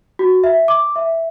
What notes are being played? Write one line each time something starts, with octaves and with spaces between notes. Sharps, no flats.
F#4
E5
D6
E5